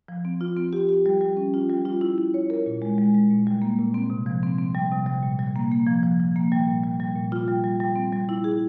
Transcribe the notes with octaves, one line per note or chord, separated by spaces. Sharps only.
F3
C4
F4
C4
G4
G4
G3
G3
C#4
F4
G3
F4
E4
E4
C#5
A#4
A#2
G#3
G#3
G#3
A#2
G3
A#3
A#2
C4
C3
F3
C4
C4
G3
C3
G3
A#2
G3
A#3
A#3
F3
F3
F3
A#3
G3
A#2
G3
G3
A#2
F4
G3
G3
G3
C4
G3
E4
G#4